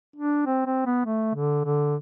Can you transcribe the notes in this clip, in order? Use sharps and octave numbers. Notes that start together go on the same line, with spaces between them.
D4
C4
C4
B3
A3
D3
D3